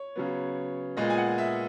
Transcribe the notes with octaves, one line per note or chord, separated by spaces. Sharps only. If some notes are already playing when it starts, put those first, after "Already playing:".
Already playing: C#5
C#3 F#3 B3
A#2 G#3 B3 D#5
G#5
F#5
E5